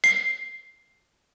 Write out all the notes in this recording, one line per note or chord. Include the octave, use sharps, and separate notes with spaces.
C7